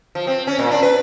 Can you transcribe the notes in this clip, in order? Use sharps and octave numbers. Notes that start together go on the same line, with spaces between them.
F3
C4
C#4
A#2
D4
B4